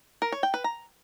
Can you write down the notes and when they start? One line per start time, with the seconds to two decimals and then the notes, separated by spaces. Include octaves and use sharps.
0.22 A#4
0.32 C#5
0.43 G5
0.54 B4
0.64 A#5